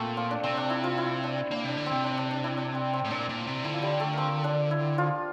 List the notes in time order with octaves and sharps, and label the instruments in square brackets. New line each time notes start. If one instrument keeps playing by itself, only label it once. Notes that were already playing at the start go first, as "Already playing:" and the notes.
Already playing: [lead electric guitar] A#2 [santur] A3 C4 A4 C5
[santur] F3 F4
D4
[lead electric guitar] C3 [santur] C4
[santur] D4
E4
F3 F4
E4
D4
[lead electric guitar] A#3 [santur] D4
[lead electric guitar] C3 [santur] D4
[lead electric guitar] D3
[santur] C4
[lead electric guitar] C3
[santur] D4
D4
D4
E4
D4
C4
C4
[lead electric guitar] A2
[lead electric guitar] A#2 [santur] D4
[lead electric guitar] A#2
C3
[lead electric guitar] D3 [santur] E4
[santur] F4
G3 G4
A3 A4
C4 A#4 C5
D4 D5
E4
F3 F4